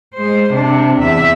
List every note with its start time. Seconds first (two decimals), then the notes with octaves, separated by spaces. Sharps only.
0.14 G#3 C5
0.51 C3 D4
1.01 E2 E5